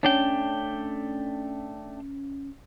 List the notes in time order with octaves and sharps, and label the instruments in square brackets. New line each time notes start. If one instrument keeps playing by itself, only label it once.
[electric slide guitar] A3 D4 G5 [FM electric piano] C#4